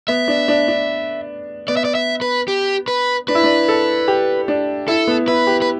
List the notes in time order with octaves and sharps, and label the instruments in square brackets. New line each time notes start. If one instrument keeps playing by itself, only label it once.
[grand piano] B3 [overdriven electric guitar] E5
[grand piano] D4
D4
D4
[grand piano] B3 [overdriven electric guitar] D5
[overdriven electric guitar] E5
D5
E5
B4
G4
B4
[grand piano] D4 [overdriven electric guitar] B4
[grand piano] E4
D4
A4
G4
D4
[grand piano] E4 [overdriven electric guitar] A4
[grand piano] B3
[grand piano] E4 [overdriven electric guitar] B4
[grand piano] G4
[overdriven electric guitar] B4